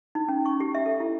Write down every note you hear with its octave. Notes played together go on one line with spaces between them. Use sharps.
D#4
C#4
C#6
G4
E5
A4
E4